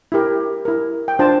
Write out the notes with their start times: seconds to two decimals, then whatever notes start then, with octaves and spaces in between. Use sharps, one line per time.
0.12 E4 G4 A#4
0.65 E4 A#4
1.08 G5
1.19 D4 F4 C5 A5